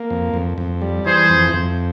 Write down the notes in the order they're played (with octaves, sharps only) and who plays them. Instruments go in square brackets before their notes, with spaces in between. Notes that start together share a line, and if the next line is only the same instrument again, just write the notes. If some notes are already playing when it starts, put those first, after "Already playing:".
Already playing: [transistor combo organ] A#3
F2
F2
F2
G3
[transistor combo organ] E3 [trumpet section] G#4 C5
[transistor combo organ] F2
F2